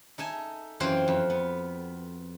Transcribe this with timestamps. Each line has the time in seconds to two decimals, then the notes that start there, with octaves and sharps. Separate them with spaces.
0.18 D#4 A4 E5 G#5
0.80 F#2 E3 C4 F4 C5 G5
1.08 F2
1.30 B3